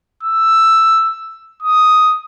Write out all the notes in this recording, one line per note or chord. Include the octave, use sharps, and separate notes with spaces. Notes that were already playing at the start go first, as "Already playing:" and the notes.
E6
D#6